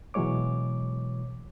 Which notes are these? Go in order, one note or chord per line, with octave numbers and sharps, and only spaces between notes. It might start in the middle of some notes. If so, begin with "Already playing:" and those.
B2 E3 F#3 G#3 C#5 D6